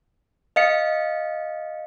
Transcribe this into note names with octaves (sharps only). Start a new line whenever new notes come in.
D#5 F5 C#7